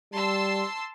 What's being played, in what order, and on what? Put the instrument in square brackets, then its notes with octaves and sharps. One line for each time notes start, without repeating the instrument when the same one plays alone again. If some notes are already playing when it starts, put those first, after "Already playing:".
[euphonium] G3 [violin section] A5 C6 E6